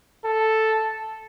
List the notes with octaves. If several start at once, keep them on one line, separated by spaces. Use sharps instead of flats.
A4